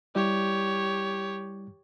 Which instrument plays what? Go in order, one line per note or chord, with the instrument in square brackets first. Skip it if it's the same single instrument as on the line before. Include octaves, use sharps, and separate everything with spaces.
[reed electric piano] G3 E4 D5 [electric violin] G4 C#5